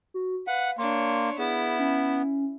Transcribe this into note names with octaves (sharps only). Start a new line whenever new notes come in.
F#4
B4 F5 F#5
A#3 D4 C#5 C6
B3 E4 G#4
C#4